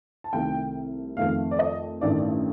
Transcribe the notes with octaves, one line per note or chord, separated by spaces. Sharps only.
A5
C2 C3 D#3 A3 G5
F2 D#3 A3 F5
D5
D#5
A1 G2 D#3 A3 D5